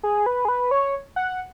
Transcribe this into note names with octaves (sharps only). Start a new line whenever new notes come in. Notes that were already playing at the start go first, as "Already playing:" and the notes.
G#4
B4
G#4
B4
C#5
F#5